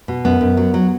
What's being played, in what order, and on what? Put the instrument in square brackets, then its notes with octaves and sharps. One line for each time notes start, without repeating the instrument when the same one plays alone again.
[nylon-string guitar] B2
F#2 B3
F#2
F#3
F#3